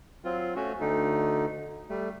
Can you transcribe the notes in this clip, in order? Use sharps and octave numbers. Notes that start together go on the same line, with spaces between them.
F#3 C4 F4
A3 C#4 F#4
D2 D3 A3 D#4
G3 A3